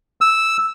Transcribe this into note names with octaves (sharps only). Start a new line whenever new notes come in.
E6